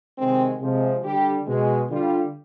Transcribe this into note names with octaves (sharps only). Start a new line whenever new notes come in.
C3 D#3 G#3 C4
C3 F3 G#3
D3 G3 G4
B2 G#3
D3 G3 F4